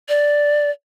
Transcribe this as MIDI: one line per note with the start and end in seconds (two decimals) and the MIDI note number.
0.09 0.71 74